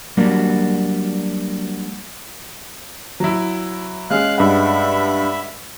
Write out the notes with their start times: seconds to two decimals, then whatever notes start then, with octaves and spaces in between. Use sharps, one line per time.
0.17 F#3 G3 A#3 D4 F#4
3.20 F#3 E4
4.10 G#3 C#4 G#4 F5 F#6
4.38 G2 E5 F#5 B5